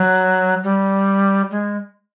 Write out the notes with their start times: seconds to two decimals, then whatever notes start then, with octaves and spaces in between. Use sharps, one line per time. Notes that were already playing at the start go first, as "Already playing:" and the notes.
Already playing: F#3
0.64 G3
1.51 G#3